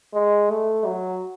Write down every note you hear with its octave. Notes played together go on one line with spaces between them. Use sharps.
G#3
A3
F#3